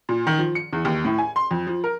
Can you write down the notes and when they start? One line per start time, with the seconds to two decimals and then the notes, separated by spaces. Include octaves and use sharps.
0.09 A#2
0.27 D#3
0.39 F3
0.55 C#7
0.73 E2
0.85 D#2
1.05 A2
1.18 G#5
1.36 C6
1.51 F2
1.67 F3
1.84 A#4